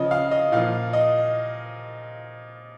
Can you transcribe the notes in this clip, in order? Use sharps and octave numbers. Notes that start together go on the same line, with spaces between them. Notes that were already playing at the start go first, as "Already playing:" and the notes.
Already playing: C#3 F3 D#5
F5
D#5
A#2 F3 F5
D#5